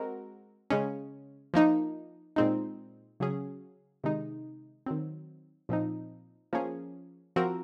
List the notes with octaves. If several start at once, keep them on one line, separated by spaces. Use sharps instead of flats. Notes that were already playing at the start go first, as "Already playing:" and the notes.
Already playing: G#3 C4 F#4 A#4
C#3 G#3 C#4
F3 A#3 D#4
A#2 G#3 C4 D#4
C#3 F#3 C#4 G#4
C3 D#3 G#3 D#4
D#3 F#3 C4
A#2 F3 C4 D#4
F3 A#3 C#4 G#4
F3 C4 F#4 A#4